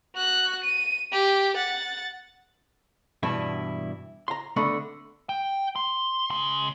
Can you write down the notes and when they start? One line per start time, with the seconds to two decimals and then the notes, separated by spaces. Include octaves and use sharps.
0.16 F#4 F#6
0.64 D#7
1.12 G4
1.56 F#5 A6
3.23 G2 B2 E3 D4 E4
4.28 A#5 C6
4.56 D3 A3 B3
5.29 G5
5.76 C6
6.30 C#3 C6